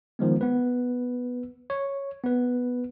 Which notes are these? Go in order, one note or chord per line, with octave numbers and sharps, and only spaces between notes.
D#3 F3 G#3 B3
B3 B4
C#5
B3 B4